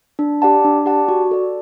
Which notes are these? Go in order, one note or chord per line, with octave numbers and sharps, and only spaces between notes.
D4
G4 D5 F#5 A5
D4
G4 D5 F#5 A5
F#4
A4 D5